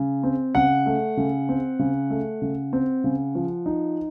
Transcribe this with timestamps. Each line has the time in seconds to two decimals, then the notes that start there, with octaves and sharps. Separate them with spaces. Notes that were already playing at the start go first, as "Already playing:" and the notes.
Already playing: C#3
0.23 C4
0.55 C#3 F#5
0.86 A3
1.17 C#3
1.49 C4
1.79 C#3
2.10 A3
2.42 C#3
2.73 C4
3.04 C#3
3.35 F3
3.66 D#4